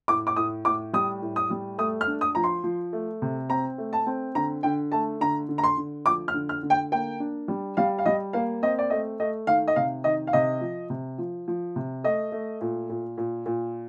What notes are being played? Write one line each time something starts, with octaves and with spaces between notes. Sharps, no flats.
A2 D6
D6
A2 D#6
A2 D6
G3 D#6
A2
D#6
G3
A3 D#6
F6
D4
D#6
F3 A#5
C6
F3
A3
C3
C4 A#5
A3
A5
C4
D3 A#5
D3 G5
A3 A5
D3 A#5
D3
A#5
C6
D3
F3 D6
F6
D3
F6
D3
G5
A#3 G5
D4
G3
G3 F5
F5
G3 D#5
A#3 F5
C4 D#5
D5
A3 D#5
A3 D#5
D#3 F5
D#5
C3 F5
D#3 D#5
F5
C3 D#5
F3
C3
F3
F3
C3
A3 D#5
A3
A#2
A#2
A#2
A#2